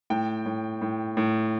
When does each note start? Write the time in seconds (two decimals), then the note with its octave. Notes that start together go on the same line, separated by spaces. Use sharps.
0.10 A2 G5
0.46 A2
0.81 A2
1.17 A2